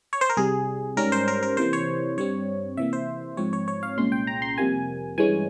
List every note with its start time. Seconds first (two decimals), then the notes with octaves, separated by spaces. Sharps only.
0.13 C#5
0.21 C5
0.30 A#4
0.37 C2 C3 G3 G#4
0.97 G#2 G3 C#4 A#4
1.12 C5
1.28 A#4
1.43 A#4
1.57 C3 E3 A#3 C5
1.73 C#5
2.17 G2 G3 C4 C#5
2.77 C3 E3 A#3 E5
2.93 C5
3.37 G#2 F3 C4 C#5
3.53 C#5
3.68 C#5
3.83 F5
3.97 C2 A#2 G#3 C#4 C6
4.12 G5
4.27 A#5
4.42 C6
4.58 F2 C3 G3 A#3 G#5
5.18 G2 E3 G#3 C#4 G#5